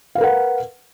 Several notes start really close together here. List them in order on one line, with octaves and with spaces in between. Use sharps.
F5 B4 A#4 F#5